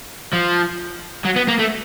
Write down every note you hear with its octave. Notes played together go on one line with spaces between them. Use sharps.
F3
F#3
B3
A#3
A3